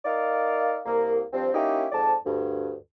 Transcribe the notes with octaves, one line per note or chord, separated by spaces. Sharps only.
D#4 A#4 D5 F5
C2 A#3
G2 F3 C4
A#3 C#4 D#4 E4 G4
F2 G#2 D5 A5
D2 G2